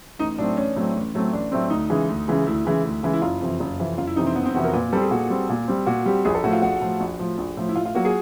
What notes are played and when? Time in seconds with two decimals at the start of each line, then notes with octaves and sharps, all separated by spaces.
0.19 A1 D#4
0.38 A2 F#3 A3 C4 D4
0.57 A1 C#4
0.76 A2 F#3 A3 C4
0.95 A1
1.14 A2 F#3 A3 C4
1.33 A1 D4
1.52 A2 F#3 A3 C4
1.70 D2 D#4
1.90 C#3 E3 G#3
2.09 D2
2.28 C#3 E3 G#3
2.46 D2 E4
2.65 C#3 E3 G#3
2.84 D2
3.03 C#3 E3 G#3
3.13 E4
3.22 F#1 F4
3.41 F2 C3 E3
3.60 F#1
3.78 F2 C3 E3
3.98 F#1 F4
4.07 E4
4.16 F2 C3 E3 D#4
4.27 C4
4.35 F#1 B3
4.46 C4
4.54 F2 C3 E3 F#4
4.64 A#4
4.73 A#2 B4
4.92 G3 C4 A4
5.02 G#4
5.11 A#2 F#4
5.30 G3 C4
5.49 A#2
5.68 G3 C4
5.86 A#2 F#4
6.06 G3 C4 G4
6.25 A#1 G#4
6.35 A4
6.44 A2 F3 F#4
6.53 F4
6.62 A#1 F#4
6.81 A2 F3
7.00 A#1
7.19 A2 F3
7.38 A#1
7.57 A2 F3
7.69 E4
7.75 A2 F4
7.85 F4
7.95 F#3 A#3 F#4
8.05 G#4